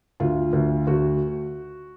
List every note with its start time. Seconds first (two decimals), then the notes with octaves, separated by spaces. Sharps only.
0.20 D2 F4
0.53 D2
0.87 D2 F#4